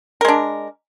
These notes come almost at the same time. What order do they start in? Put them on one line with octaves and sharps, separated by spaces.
A#4 G#3 D4